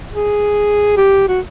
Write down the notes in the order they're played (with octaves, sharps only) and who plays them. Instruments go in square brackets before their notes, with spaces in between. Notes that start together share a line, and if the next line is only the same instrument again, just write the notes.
[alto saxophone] G#4
G4
F#4